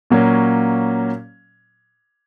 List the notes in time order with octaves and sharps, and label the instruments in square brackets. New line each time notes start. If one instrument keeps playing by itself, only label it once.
[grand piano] A#2 F#3 A#3 C#4